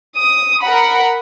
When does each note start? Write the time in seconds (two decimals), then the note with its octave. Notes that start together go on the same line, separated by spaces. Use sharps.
0.17 D#6
0.62 A#4 F#5 B5